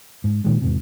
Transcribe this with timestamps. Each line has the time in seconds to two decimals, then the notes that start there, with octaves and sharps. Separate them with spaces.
0.24 G#2
0.44 A#2 D#3 G#3
0.62 E2 G#2 C3